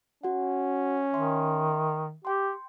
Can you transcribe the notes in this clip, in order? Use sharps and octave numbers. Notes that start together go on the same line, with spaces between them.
C#4 F#4 F#5
D#3 E5 C6
G4 G5 C6